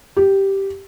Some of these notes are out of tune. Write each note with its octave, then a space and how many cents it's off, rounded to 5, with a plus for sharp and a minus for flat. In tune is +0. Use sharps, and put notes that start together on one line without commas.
G4 -5